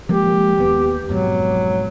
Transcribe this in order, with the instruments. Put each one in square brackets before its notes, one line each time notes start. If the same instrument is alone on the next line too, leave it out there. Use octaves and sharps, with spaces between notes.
[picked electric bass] F3 G#3 A#3 [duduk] G4
[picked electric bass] D#2 B3
[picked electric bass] F2 G#2 B2 [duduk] F#3